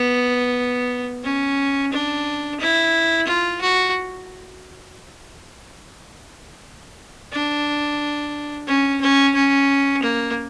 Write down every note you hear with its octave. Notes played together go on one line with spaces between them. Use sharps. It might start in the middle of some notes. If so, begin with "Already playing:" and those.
Already playing: B3
C#4
D4
E4
F4
F#4
D4
C#4
C#4
C#4
A#3